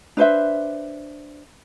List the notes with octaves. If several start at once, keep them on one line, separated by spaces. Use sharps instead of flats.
D4 B4 C5 E5